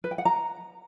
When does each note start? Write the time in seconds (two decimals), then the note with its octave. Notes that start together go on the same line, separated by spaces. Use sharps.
0.04 B4
0.11 G5
0.18 F#5
0.25 A#5